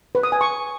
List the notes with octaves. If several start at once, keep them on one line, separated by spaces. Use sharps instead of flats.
B4
D#6
G#5
C#6